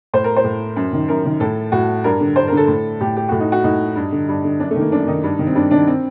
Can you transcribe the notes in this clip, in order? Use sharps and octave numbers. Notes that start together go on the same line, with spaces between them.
A2 C5
A#4
C5
A2
F#2
D#3
F#2 A#4
D#3
A2 A4
A2 F#4
G2 A#4
D3
G2 C5
A#4
D3 A4
A2
A2 G4
G4
A2 F#4
D#4
F#4
A2 D#4
G2
D3
G2
D3
F#2 D4
A3
D#3 A#3
F#2 D4
D#3 D#4
G2
D#3
C4
G2 D4
D#3 D4
C4